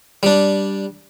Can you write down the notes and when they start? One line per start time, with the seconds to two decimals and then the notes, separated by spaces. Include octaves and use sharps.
0.23 G3 D4